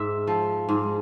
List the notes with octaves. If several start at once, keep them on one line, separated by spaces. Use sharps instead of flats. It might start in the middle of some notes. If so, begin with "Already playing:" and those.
Already playing: G#2 E5
F3
G#2